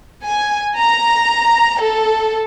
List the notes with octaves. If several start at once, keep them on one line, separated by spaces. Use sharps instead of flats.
G#5
A#5
A4